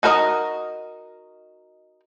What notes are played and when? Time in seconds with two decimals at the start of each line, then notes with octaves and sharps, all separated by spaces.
0.03 D#4 F#4 A#4 B4 D#5